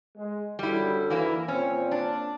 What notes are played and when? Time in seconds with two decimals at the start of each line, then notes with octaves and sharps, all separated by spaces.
0.17 G#3
0.59 F#2 D3 G3 E4
1.10 E3 A#3 E4
1.48 A#2 C4 C#4
1.91 D4